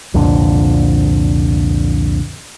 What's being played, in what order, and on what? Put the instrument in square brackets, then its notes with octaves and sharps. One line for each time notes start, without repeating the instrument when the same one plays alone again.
[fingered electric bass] C2 F2 A#2 D3